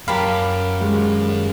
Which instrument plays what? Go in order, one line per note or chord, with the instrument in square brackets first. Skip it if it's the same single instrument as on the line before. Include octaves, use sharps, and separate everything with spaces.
[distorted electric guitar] F#2 [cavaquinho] G4 A5 B5 [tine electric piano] A#4 F5
[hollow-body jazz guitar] D#2 G3 G#3